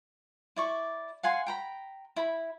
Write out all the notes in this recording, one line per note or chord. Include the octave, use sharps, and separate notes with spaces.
E4 D5 C#6
F5 F#5 G#5 C6
G5 A#5 B5
E4 B5